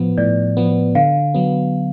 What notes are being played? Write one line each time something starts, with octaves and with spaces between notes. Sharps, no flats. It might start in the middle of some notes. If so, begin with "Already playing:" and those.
Already playing: A2 F3 B3
A2 D5
F3 B3
D3 F5
F#3 B3